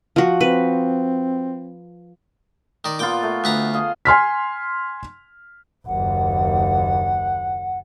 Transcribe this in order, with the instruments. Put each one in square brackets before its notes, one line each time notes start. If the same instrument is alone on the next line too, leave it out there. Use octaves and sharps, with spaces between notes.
[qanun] F3 F#4
[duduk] C4 [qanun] B4
[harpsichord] D#3 D5
[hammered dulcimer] A#2 B3 F4 [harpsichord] G5 D6
[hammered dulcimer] A3
[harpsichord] D2 B4 A#5
[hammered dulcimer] G#4 D#5 F5
[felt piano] G#5 C6 F6 B6
[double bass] F#1 D#2 [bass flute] F#5